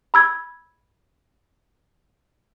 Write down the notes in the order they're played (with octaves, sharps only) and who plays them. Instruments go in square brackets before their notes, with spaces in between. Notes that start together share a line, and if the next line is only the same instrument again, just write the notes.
[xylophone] B5 E6 G#6